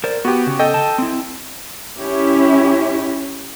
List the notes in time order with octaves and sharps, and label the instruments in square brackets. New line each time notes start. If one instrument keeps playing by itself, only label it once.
[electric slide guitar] A#4 C5 D5
[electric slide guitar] B3 [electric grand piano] F#4 G4
[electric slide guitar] C#3
[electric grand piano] A4 D#5 G5
[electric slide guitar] A5
C4 E4
[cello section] C#4 E4 G4